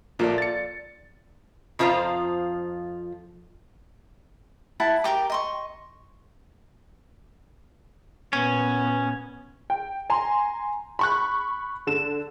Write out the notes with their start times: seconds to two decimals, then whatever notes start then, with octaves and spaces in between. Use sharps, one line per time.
0.19 A#1 A#3 F4 A4 D5
0.38 A6 C#7
1.79 F2 F3 F4 C5 A#5
4.80 E4 F#5 A5
5.04 G4 A#4 G5 D6
5.30 D#5 C6 C#6
8.33 A#2 B3 C#4
9.70 G5
10.10 G#5 A#5 C6
10.99 B5 C#6 F#6
11.87 D3 E7